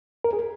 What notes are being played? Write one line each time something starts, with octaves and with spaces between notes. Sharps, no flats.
A#4
G#4